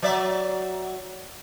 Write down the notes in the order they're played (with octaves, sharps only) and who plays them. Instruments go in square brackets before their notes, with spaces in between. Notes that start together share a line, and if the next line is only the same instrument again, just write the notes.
[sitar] F#3 D5 E5